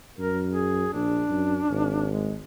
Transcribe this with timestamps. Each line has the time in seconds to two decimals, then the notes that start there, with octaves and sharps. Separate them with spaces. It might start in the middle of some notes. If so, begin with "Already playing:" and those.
0.19 F#2 A#4
0.51 G#4
0.93 A#1 D4
1.30 F#2
1.70 G#1
2.11 G#3